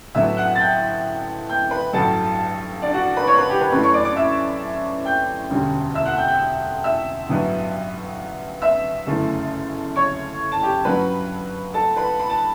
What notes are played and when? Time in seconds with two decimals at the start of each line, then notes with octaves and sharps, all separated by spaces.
0.15 A1 A2 F#3 B3 D4 E5 E6
0.37 F#5 F#6
0.55 A6
0.59 G5 G6
1.49 G5 G6
1.71 B4 B5
1.93 A1 G2 F#3 A4 A5
2.82 D4 D5
2.93 F#4 F#5
3.17 B4 B5
3.27 C#5 C#6
3.38 B4 B5
3.50 G4 G5
3.61 B4 B5
3.72 F#2 E3 A3 B4 B5
3.83 C#5 C#6
3.94 D5 D6
4.05 D5 D6
4.16 E5 E6
5.05 G5 G6
5.50 E1 D2 D3 G3 C#4
5.94 E5 E6
6.05 F#5 F#6
6.17 G5 G6
6.28 G5 G6
6.84 E5 E6
7.29 A1 G2 F#3 B3 D4
8.62 E5 E6
9.07 G1 F#2 C#3 E3 A3
9.96 C#5 C#6
10.52 A5
10.63 G4 G5
10.85 G2 F#3 C#4 B4 B5
11.74 A4 A5
11.96 B4 B5
12.19 B5
12.29 A5